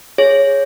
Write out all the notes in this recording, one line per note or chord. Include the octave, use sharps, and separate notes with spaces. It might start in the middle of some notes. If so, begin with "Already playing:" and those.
G#4 C#5